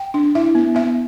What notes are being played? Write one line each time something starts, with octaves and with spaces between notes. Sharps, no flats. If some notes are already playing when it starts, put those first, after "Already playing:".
Already playing: G5
D4
E4 E5
B3
B3 E5